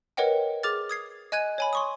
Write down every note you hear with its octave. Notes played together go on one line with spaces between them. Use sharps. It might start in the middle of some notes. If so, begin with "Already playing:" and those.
A#4 B4 C#5 D#5 F#5 G5
G#4 D6 F6 A6
D#6 G#6 C7
D#5 G#5 F#6 G#6 D#7
C#5 G#5 B5
C6 C#6 D#6